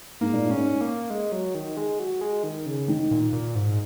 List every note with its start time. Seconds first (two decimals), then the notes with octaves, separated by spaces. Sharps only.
0.21 G#2 A#3
0.33 A#2
0.46 G#2
0.51 C#4
0.81 A#3
1.10 G#3
1.32 F#3
1.55 D#3
1.77 G#3
1.99 F#3
2.21 G#3
2.44 D#3
2.66 C#3
2.88 D#3
3.11 A#2
3.33 A#2
3.55 G#2